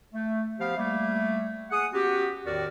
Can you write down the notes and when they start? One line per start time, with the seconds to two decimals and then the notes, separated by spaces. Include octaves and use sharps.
0.13 A3
0.60 F3 B3 G4 F5
0.77 G3 A3 A#3
1.71 G#4 F#5 D#6
1.93 B3 C#4 F#4 G4
2.45 E2 A2 D#3 F#4 A#4 D5